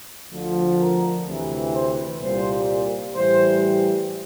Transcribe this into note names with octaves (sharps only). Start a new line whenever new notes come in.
D2 D3 F3
A#4
D2 C3 E3
C5
C2 A#2 G3 C5
A2 E3 G3 C5